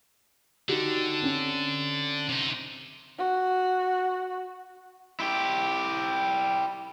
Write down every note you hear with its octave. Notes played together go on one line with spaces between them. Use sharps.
D3 D#4 F#4 G4
C4 C#4
C3 D#4
F#4
E4 G4